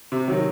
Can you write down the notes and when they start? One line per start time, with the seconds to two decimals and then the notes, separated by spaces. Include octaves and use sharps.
0.12 C3
0.28 D#3 F#3